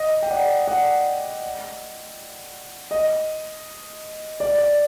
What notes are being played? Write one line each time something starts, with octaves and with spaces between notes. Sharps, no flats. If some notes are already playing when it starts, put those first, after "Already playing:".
Already playing: D#5
G5
D5 F#5
D5 F#5
D#5
D5
D5